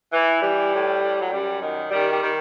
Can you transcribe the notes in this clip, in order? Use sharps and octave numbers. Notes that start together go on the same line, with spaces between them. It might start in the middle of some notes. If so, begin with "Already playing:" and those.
E3
E3 G3
A2
A2
F#3
F#2 G3
D#3
D#3 G3
G3
D#3